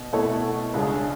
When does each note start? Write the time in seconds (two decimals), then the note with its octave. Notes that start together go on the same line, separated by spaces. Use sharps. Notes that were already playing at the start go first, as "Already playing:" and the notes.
Already playing: B2
0.13 B2 A3 E4 A4 C#5
0.74 C#2 C#3 G#3 D4 G#4